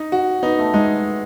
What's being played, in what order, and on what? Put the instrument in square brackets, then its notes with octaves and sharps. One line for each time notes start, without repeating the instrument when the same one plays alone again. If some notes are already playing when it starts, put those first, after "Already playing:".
Already playing: [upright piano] D#4
F#4
[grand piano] B3 [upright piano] D#4
[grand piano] A3
[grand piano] G#3 [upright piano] D#4